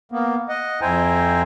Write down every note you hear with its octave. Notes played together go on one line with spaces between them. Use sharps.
A#3 B3
D#5 F#5
F2 E4 C5 G5 G#5 A#5